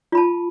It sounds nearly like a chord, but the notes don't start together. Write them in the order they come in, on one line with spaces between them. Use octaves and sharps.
F4 B5 A5